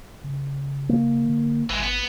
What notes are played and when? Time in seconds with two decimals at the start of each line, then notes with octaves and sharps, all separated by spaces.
0.24 C#3
0.89 A#3
1.26 D3
1.70 G#1 E3 G#3
1.83 B3